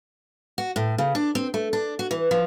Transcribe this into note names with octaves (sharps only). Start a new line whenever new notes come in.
F#4
A2
C#3
D4
C4
A3
D4
F#4
E3
F3